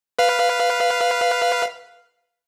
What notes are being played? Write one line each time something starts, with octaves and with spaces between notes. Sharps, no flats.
B4 F5